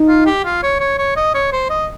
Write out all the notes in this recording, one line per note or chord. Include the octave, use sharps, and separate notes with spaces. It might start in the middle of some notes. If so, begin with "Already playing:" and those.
Already playing: D#4
F4
G4
F4
C#5
C#5
C#5
D#5
C#5
C5
D#5